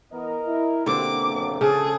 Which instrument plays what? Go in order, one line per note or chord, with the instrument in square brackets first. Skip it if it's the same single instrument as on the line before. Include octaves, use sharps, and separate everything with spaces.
[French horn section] E3 B3 [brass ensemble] A#4 D#5
[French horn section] E4
[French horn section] B2 A#3 [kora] D3 C4 [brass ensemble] G4 [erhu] D6
[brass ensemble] F#1
[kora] C#3 [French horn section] F3 G#3 C#4 [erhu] G#4 [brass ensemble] A4